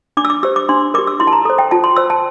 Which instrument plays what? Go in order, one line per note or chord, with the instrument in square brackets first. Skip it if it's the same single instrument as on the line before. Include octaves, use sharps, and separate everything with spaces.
[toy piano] D4 D6
E6
D6
G4 C5 E6
D6
D4 C6
A#4 D6
G4
E6
E4 C6
A5
A#5
A4 C5
G5
F4 A5
C6
C5 E6
A5